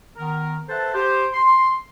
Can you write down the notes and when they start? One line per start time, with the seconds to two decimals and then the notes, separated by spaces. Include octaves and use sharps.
0.16 D#3 B3 A#4
0.69 A4 B4 C5 E5 F#5 A5
0.95 G4 C5
1.33 C6